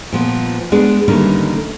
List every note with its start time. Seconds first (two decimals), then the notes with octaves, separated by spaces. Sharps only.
0.12 A#2 F3 B3
0.72 G#3 B3 D4 G#4
1.08 D3 D#3 G3 A3 A#3 C#4